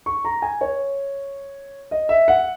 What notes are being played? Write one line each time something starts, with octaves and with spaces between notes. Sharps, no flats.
C#6
A#5
G#5
C#5
D#5
E5
F#5